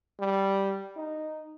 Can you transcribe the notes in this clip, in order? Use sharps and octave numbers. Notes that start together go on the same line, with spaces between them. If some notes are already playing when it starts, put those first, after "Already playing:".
G3
D#4